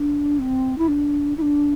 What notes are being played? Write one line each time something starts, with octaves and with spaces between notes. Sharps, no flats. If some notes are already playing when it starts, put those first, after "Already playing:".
Already playing: D4
C4
E4
D4
E4
D4